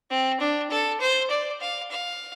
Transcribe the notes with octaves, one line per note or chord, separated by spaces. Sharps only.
C4
D4
A4
C5
D5
F5
F5